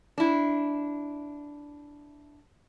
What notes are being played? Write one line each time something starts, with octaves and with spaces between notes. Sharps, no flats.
D4 E4